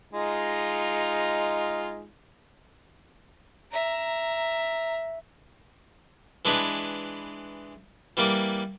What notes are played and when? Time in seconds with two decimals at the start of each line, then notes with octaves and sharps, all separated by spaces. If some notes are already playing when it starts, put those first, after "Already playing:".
0.13 G#3 D#4 F4
3.72 E5 A#5
6.45 E3 G#3 D4 B4
8.17 E3 G3 A#3 D6